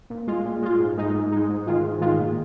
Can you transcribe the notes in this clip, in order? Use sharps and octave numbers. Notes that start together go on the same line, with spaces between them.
A#2
G#3 F4
A#2
G#3 F4
G#2
G#3 D#4
G#2
G#3 D#4
G#2
D#3 G#3 F4
G#2
D#3 G#3 F4
A#2